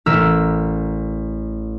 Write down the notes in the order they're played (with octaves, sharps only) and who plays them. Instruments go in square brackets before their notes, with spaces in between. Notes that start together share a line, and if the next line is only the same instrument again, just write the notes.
[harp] A1 A#4 E6 A#6 B6 E7